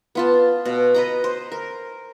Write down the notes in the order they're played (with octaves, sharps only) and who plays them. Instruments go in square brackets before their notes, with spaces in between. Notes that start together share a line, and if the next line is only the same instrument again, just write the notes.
[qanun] B3 F4 A5
B2
B4 D#5 A#5
C5
A#4